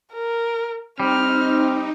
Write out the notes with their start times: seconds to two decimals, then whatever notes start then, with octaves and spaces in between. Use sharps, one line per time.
0.13 A#4
1.00 G3 C4 D#4 F6